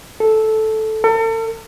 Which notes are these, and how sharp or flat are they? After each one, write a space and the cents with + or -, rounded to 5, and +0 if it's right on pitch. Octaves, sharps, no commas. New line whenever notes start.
A4 -10
A4 +40